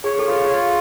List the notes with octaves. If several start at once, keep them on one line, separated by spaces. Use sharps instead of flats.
G#4 C#5
A4
F4
G#4
F4